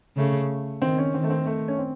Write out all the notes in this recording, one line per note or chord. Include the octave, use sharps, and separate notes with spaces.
C#3 A3
D#3 C4
C#4
D#3 C4
A3
C4
A3
C#4
C4